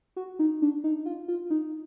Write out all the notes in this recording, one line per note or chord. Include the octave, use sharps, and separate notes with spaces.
F#4
D#4
D4
D#4
F4
F4
D#4